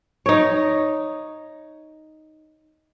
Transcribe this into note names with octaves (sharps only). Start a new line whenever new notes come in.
D#4 C#5